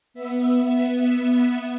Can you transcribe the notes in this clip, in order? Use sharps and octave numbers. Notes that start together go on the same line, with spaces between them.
B3 E5